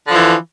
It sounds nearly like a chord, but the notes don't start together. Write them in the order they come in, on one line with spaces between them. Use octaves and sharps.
D3 F3 E3